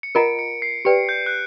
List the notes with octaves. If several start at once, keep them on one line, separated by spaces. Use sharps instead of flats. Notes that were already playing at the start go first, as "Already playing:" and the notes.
C#7
F4 A#4 D#5 F#5 A#5 D7
C#7
C7
G4 B4 D5 G5 C#7
G6
F#6